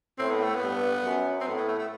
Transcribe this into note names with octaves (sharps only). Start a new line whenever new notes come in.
A2 C4
B3
A3
B3
G2
F#2
C4
A2 B3
B3
A3
A3